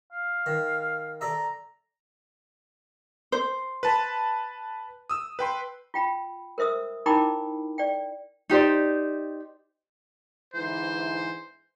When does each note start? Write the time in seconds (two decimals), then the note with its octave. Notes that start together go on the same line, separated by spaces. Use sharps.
0.12 F5
0.46 D#3
1.21 A4 D5 E5 A#5
3.32 C5
3.83 B4 A5 B5
5.10 D#6 E6
5.39 B4 G5 C6
5.94 F4 G5 B5
6.58 A#4 C5 E5 D#6 E6
7.06 D#4 E4 A#4 G5 B5 D6
7.78 D5 G5
8.50 D#4 G4 C5 D5
10.54 G#2 D3 E3 C5